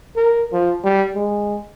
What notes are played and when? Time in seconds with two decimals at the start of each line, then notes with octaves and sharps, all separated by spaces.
0.16 A#4
0.53 F3
0.84 G3
1.15 G#3